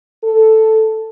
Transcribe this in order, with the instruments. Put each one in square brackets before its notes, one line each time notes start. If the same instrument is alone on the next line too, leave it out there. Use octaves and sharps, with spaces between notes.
[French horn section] A4